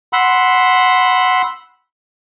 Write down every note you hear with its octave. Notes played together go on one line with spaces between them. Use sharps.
F#5 B5 C6 E6